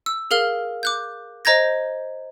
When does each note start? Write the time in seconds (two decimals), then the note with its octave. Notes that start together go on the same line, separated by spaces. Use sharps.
0.06 E6
0.31 G#4 A#4 F5 F6 G7
0.83 D6 F#6 G6
1.45 C5 D#5 A#5 G6 G#6 A#6